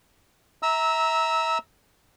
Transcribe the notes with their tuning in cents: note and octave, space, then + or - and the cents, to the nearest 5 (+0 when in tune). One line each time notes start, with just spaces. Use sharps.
E5 -25 A#5 +0 E6 -15